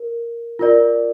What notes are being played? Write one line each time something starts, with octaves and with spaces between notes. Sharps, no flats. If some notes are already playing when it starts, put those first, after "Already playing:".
Already playing: A#4
F4 A#4 D5